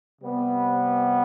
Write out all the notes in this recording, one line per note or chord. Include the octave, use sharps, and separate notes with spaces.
C3 G3 B3